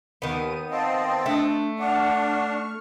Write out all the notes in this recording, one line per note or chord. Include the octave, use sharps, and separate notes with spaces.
D#2 D#3 B3 D#7
C4 D#5 F5 A5
A3 D4
D4 F#5 C#6 F6